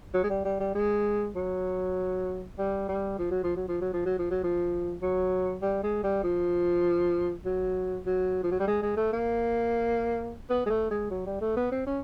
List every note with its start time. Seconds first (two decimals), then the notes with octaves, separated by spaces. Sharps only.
0.14 F#3
0.24 G#3
0.30 G3
0.45 G3
0.60 G3
0.75 G#3
1.36 F#3
2.58 G3
2.89 G3
3.19 F3
3.31 F#3
3.44 F3
3.56 F#3
3.68 F3
3.81 F#3
3.94 F3
4.06 F#3
4.19 F3
4.31 F#3
4.44 F3
5.02 F#3
5.62 G3
5.83 G#3
6.04 G3
6.24 F3
7.45 F#3
8.06 F#3
8.43 F3
8.51 F#3
8.60 G3
8.67 G#3
8.83 G#3
8.97 A3
9.13 A#3
10.50 B3
10.66 G#3
10.70 A3
10.91 G#3
11.11 F#3
11.26 G3
11.41 A3
11.57 B3
11.72 C4
11.87 C#4